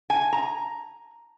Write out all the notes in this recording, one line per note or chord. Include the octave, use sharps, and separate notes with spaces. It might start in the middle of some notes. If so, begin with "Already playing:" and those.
G#5
A#5